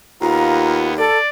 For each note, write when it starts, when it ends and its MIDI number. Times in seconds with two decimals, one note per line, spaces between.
0.21 1.05 39
0.21 0.95 59
0.21 0.89 65
0.21 0.78 82
0.98 1.18 69
0.98 1.28 74